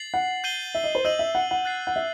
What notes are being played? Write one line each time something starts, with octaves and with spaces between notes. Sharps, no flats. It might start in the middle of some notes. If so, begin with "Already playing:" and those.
Already playing: A6 C7 F#7
F#5
G6 C7 D#7 G7
E5
D#5
C5
D#5 E6 G6 D#7 F#7
E5
F#5
F#5
F#6 A6 C7
F#5
E5